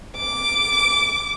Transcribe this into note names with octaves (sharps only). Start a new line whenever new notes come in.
D6